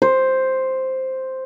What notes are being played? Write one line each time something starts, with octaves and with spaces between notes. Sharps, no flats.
C5